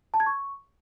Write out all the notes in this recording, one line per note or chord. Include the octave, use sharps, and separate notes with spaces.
A5
G#6
C#6